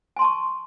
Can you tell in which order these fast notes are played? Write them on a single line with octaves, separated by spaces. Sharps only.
G#5 C6 A5 C#6